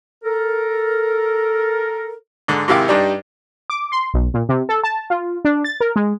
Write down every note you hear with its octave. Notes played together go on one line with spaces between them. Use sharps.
A4 A#4
G#2 D3
G#2 C3 D#3 E4 F5 D6
G2 G3 D4 D#4
D6
C6
B1
A#2
C3
A4
A5
F4
D4
A6
A#4
G#3